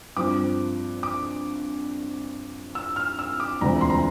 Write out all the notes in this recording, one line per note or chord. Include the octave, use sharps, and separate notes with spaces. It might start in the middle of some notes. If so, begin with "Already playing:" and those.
G2 F3 C4 D6
D6
E6
F6
E6
D6
E1 D2 C3 F3 C4 A#5
C6
A#5